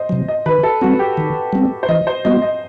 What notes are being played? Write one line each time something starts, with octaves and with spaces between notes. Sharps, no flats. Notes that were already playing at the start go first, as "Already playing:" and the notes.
Already playing: C5 D#5
C3 F#3
D#5
D#3 B4
A4
G3 C4 F#4
G4
D#3
G3 C4
C5
E3 D#5
C5
G3 B3 F#4 D#5
D#5